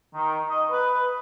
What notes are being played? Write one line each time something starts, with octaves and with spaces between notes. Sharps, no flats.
D#3
D#5
B4